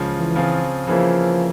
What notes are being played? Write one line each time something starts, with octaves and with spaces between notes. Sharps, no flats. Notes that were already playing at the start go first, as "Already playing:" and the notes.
Already playing: C#2 C#3 F3
E3
C#3 F3 C4 F4 G#4
C#3 E3 F3 A#3 E4